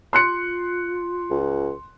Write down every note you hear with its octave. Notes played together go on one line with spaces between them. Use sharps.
F4 C6 F#6 C#7
C#2